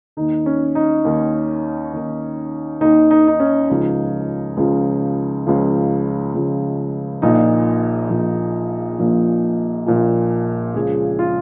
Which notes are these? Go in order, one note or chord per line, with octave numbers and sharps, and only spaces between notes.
D#2 D#3 D#4
C#4
D#4
D#2 D#3
D#2 D#3
D#2 D#3 D#4
D#4
D#4
C#4
C#2 C#3 F3 D#4
C#2 C#3 F3
C#2 C#3 F3
C#2 C#3 F3
A#1 A#2 F3 D#4
A#1 A#2 F3
A#1 A#2 F3
A#1 A#2 F3
C#2 C#3 F3 G#4
F4